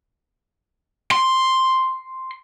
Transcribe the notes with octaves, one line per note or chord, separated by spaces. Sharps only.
C6